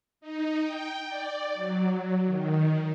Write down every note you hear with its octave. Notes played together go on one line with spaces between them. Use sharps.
D#4
G5
D5
F#3
D#3